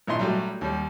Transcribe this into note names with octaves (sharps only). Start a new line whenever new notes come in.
G#1 A#2 E4 D#5 C6
F#3 G3 A3
D#2 G3